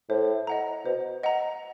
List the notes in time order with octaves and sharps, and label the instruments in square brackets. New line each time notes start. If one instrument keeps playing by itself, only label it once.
[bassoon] A2 [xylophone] C5
[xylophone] D#5 F#5 A#5
[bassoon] B2 [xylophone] C5
[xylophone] D#5 F#5 A#5